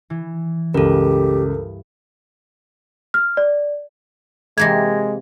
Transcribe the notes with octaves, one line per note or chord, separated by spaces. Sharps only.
E3
C#2 G2 G4 A4 A#4
F6
D5
C3 E3 G#3 A#3 G#6 A#6